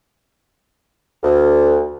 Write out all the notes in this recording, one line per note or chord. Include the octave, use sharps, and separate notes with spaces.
D2